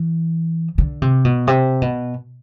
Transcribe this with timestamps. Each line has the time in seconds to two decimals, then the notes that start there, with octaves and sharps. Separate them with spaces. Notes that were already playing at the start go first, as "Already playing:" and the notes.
Already playing: E3
0.78 D3
1.02 C3
1.25 B2
1.47 C3
1.82 B2